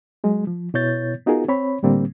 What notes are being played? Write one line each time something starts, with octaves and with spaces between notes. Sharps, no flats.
F#3 G#3
F3
B2 B3 E4 C#5 G6 A6
B3 D#4 F4 F#4 G#4 A#4
C4 C#5 B5
A2 D3 G3 A#3 C4